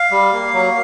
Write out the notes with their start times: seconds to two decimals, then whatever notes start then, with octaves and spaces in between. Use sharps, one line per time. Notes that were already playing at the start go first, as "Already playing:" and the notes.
Already playing: F5
0.11 G3
0.33 A#3
0.54 F#3